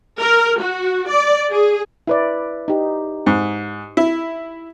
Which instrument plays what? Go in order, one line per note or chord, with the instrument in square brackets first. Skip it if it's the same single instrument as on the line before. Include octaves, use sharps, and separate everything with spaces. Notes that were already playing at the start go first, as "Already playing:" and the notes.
[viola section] A#4
F#4
D5
G#4
[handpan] E4 B4 D5
D#4 G4
[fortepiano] G#2
E4